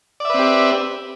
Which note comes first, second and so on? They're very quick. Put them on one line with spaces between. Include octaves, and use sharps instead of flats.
D5 E5 B4 C4 G4